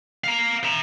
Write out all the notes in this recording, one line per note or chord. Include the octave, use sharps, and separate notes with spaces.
F5 A#5
E5 A#5